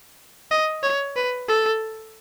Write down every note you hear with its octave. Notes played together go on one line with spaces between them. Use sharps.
D#5
C#5
B4
A4